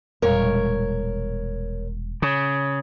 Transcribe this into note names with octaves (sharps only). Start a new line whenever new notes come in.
E1 A#2 G3 A#4 C#5 F5
C#3